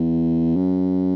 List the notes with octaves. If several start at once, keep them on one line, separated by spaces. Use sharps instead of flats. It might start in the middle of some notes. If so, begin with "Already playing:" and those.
Already playing: E2
F#2